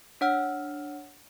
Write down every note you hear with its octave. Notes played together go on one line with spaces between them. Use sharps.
D4 C#5 F#5 E6 F6